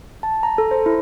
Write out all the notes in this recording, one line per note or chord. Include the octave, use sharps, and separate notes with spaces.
A5
A#5
A4
C5
E4